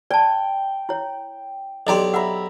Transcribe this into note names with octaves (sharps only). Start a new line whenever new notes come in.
D5 G5 A5
E4 C#5
B1 D4 G4 D#5 A#5 C6
E5 F#5 A#5 B5